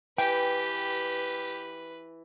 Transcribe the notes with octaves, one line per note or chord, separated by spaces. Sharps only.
E3 G4 B4 G5